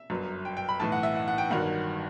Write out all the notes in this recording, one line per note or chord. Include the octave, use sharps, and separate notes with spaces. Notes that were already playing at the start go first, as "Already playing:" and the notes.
Already playing: E5
G1 F#2 F#3
G5
G5
B5
B1 A2 E3 A5
F#5
E5
F#5
F#5
G5
G1 G2 D#3 F#3 F#5